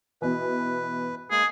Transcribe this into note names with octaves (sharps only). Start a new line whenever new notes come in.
B2 E3 B4
G#3 A#3 G#4